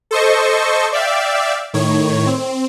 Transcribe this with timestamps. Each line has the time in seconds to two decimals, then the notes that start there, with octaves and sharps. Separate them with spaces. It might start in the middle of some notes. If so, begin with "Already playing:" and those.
0.11 A4 C5 D#5 C#6
0.93 D5 E5 F5 G5
1.74 A2 D#3 C#5
2.27 C4